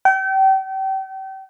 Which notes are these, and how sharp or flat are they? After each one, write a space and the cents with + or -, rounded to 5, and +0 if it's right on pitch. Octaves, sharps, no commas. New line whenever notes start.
G5 -35